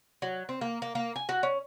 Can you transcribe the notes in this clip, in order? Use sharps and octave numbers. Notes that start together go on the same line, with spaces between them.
F#3
C4
A#3
A#3
A#3
G#5
F#4
C#4